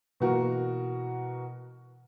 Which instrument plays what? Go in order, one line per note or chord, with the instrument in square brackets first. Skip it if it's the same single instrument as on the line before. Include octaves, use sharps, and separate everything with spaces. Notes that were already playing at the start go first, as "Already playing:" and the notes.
[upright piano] B2 E3 A#3 F#4 A#4